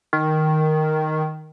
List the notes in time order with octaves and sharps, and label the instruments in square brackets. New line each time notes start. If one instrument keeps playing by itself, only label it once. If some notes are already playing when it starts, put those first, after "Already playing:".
[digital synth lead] D#3